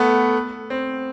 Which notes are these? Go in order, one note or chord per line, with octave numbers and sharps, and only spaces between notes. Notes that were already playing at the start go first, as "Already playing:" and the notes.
Already playing: A3 B3
C4